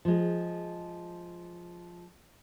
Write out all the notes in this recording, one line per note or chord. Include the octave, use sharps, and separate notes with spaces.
F3 G#3